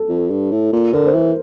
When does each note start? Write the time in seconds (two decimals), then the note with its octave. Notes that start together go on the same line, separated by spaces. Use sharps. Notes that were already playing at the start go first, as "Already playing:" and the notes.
Already playing: A4
0.09 F2
0.31 G2
0.52 A2
0.73 A#2
0.93 D3 A#4
1.06 C5
1.14 E3 A#4